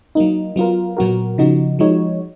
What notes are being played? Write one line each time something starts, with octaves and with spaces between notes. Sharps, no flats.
F#3 A#3 D#4
F#3 B3 F4 A#4
A#2 F#3 B3 F#4 A#4
C#3 F3 B3 D#4 F#4
F3 G#3 D#4 F#4 C#5